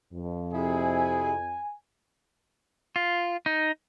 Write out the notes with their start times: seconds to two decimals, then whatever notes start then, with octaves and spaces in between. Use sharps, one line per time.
0.13 F2
0.54 C3 E4 G#4 G#5
2.96 F4
3.46 D#4